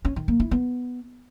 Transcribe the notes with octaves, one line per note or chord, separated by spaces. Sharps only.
C#4
D#3
A#3
E4
B3